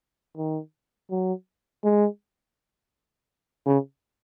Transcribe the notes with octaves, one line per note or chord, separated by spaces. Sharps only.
D#3
F#3
G#3
C#3